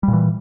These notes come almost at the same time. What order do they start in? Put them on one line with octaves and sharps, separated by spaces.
G3 A#2 E3